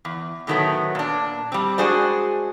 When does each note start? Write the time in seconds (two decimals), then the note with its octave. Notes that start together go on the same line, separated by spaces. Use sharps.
0.05 E2
0.47 A2 D3 D#3 F#3 A3 B3
0.95 A#2 D4
1.52 G3 C4
1.78 G#3 D4 F#4 G#4 C5 D5